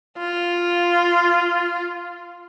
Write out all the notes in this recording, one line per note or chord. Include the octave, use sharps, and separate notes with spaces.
F4